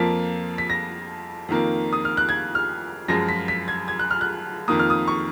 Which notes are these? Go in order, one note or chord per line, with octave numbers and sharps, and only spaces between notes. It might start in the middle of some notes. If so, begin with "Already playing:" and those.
Already playing: F2 F3 A#3 B6
B6
A#6
F2 D#3 A#3
D#6
F6
F#6
G#6
F6
F#2 F3 G#3 A#6
B6
B6
G#6
G#6
F#6
F6
F#6
F2 D#3 A#3 D#6
F6
D#6
C#6